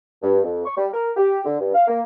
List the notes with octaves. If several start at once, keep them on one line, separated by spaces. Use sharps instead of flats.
G2
F2
C#6
G3
A#4
G4
D3
G2
F5
A#3